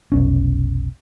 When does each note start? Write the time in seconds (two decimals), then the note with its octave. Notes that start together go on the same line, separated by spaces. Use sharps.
0.12 F1 B1 C#4